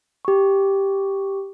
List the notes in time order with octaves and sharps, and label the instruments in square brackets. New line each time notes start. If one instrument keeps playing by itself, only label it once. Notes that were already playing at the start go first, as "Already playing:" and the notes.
[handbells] G4 C#6